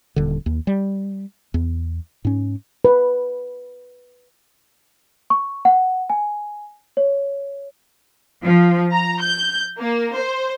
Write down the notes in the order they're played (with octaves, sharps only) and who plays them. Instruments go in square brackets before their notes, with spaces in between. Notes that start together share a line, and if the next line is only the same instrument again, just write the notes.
[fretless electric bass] D#1 D3
D#2
G3
E2
G#2 C#4
[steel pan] B4
[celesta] C#6
F#5
G#5
C#5
[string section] F3
A#5
G6
A#3
C5